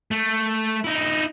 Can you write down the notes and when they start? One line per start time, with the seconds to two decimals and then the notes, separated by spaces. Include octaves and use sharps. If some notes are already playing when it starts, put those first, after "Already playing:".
0.11 A3
0.84 D#4 E4